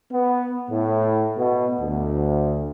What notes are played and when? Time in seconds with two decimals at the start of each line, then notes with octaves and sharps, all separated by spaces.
0.12 B3
0.70 A2
1.37 B2
1.80 D2